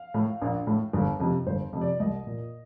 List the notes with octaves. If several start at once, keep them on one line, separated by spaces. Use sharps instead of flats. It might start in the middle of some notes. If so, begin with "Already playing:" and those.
Already playing: F5
A2
A#1
A2
G1
F2 C3
G1 C5
F2 C3
D5
C2 D#5
A#2